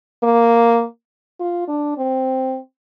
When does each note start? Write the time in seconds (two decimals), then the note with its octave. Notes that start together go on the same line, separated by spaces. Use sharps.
0.23 A#3
1.40 F4
1.68 D4
1.97 C4